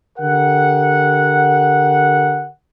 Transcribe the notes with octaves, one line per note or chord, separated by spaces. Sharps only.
D3 G4 A#4 F#5